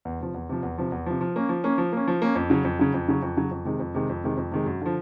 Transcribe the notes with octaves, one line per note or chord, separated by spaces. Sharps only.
E2
C3 F3
E2
C3 F3
E2
C3 F3
E2
C3 F3
F3
A#3 C#4
F3
A#3 C#4
F3
A#3 C#4
F3
A#3 C#4
F2
C#3 F#3
F2
C#3 F#3
F2
C#3 F#3
F2
C#3 F#3
F2
C3 D#3 G#3
F2
C3 D#3 G#3
F2
C3 D#3 G#3
F2
C3 D#3 G#3
F#2
D3 F3